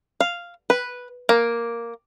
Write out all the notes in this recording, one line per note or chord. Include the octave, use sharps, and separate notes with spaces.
F5
B4
A#3